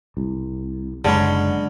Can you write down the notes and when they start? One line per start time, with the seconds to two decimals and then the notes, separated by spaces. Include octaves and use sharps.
0.17 C2
1.04 F#1 D3 G#3 B3 C#4 D#4